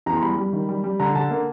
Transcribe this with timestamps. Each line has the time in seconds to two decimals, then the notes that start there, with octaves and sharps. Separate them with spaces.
0.06 E2 A#5
0.16 C6
0.22 G3 B5
0.37 G3
0.53 D#3
0.69 G3
0.84 G3
1.00 D3 A#5
1.15 D3 A5
1.31 A#3